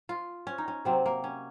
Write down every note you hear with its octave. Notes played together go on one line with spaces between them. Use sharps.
F4
C#4
D#4
C#4
C3 F#3 A#3 C4
A#3
C#4